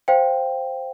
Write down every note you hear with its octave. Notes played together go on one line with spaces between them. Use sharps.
C5 F5 G5